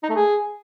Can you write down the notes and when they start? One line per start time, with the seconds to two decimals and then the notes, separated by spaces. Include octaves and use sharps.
0.03 D#4
0.09 A3
0.15 G#4